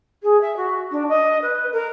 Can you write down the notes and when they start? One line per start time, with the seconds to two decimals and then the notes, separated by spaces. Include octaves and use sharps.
0.23 G#4
0.41 E5
0.57 F#4
0.91 D4
1.09 D#5
1.42 B4
1.72 A#4